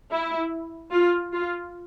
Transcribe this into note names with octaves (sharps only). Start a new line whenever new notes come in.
E4
F4
F4